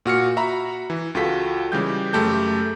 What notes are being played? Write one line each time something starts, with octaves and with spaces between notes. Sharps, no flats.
A#2 F#4 F6 C#7
F#4 E5 A#5 B5
E3
C#2 F4 F#4 A4 B6
C#3 E3 G3 G#3 G4 G6
F#2 C#3 A3 G4 A5 G6